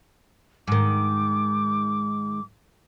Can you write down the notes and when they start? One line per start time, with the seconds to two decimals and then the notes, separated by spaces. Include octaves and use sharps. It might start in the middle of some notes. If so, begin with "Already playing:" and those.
0.68 G#2 D#3 D6